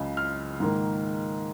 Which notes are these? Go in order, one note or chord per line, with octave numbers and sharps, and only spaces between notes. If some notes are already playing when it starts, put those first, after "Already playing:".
Already playing: C#2 C#3 G#3
F6
G#2 D#3 A#3